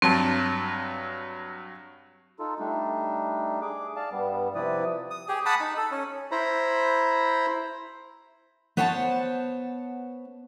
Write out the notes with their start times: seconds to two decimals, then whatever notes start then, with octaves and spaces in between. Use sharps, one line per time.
0.02 G2 F#3 C4 A5
2.40 D#4 F4 A4
2.60 G3 A3 D4 D#4
3.62 G#4 D6
3.96 D5 F5 A5
4.12 G2 G3 B3
4.55 C3 F3 E4 B4 D5 D#6
5.11 D#6
5.28 G4 G#4
5.46 F#5 A5 B5 D#6
5.60 D#4
5.77 A4
5.91 C#4
6.31 E4 C5 A#5 B5
8.77 B3 C5 C#5 F#5 G#5 A5